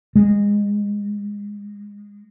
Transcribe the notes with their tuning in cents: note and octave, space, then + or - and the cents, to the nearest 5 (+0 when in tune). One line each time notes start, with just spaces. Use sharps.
G#3 -20